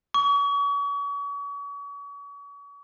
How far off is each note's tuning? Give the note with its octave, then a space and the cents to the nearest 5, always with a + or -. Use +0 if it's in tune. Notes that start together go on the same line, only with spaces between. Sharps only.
C#6 +40